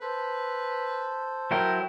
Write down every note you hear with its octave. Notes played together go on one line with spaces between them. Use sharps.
A4 B4 C5
F#3 E4 A#4 G5